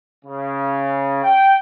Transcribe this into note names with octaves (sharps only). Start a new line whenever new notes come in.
C#3
G5